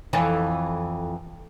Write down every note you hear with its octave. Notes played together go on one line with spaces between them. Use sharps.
F2 E3 A4